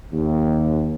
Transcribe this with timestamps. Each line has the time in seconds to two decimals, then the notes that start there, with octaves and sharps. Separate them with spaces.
0.12 D#2